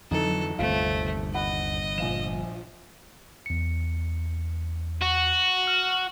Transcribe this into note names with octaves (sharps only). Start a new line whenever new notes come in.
F2 D3 E3 F#3 D#4 A4
G1 D#2 C3 A3 C4 F4
D#5 F#5 B5 F#6
A#1 F3 F4 E7
E2 C#7
F#4
F6